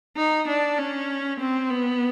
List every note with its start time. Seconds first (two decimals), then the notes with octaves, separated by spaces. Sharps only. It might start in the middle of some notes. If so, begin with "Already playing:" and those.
0.17 D#4
0.48 D4
0.78 C#4
1.40 C4
1.70 B3